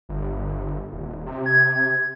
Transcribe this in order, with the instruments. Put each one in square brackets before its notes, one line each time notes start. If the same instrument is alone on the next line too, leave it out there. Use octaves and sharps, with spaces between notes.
[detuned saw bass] G1
D#1
C3
[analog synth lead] G#6